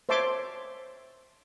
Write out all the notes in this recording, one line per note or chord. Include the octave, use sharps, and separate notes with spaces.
C5 C#5 E5 A5 C6 D6